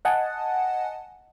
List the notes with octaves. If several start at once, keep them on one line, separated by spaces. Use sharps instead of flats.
D#5 F#5 G#5 A5